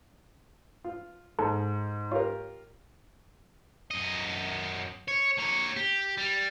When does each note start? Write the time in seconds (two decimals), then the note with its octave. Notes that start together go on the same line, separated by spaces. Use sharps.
0.84 F4
1.39 G#2 A4
2.11 F4 G4 A#4 C#5
3.91 F#2 D#5
5.08 C#5
5.38 A#3 C#5
5.76 G4
6.17 G3